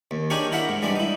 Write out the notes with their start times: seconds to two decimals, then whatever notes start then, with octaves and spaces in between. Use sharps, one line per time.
0.11 D#2
0.30 D4 D#4 G4 G#4 A#4 C#5
0.52 E4 A#4 E5 F#5
0.69 G#2
0.82 E3 G3 G#3 D4
0.96 D#4 E4